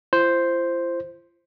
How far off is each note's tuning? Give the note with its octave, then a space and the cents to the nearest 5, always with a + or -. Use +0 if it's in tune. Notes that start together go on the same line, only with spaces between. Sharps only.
F4 -45 C5 +0